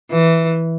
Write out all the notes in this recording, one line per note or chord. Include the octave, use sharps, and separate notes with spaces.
E3